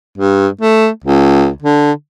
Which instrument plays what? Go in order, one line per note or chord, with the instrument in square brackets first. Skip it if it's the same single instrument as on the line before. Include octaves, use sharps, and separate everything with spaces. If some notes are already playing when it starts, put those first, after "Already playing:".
[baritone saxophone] G2
A3
C#2
D3